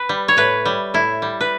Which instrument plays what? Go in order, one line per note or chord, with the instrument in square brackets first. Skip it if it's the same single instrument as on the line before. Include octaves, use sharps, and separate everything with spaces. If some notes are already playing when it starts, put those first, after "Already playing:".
Already playing: [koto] B4
G3
C#5
A2 B4
G3
A2 E4
G3
B4